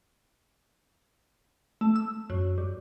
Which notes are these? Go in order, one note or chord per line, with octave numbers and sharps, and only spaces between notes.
A3
E6
F#2
G2